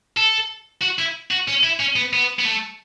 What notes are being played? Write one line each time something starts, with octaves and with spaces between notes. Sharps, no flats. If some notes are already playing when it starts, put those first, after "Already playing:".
A4
F#4
E4
F#4
C#4
E4
C#4
B3
B3
B3
A3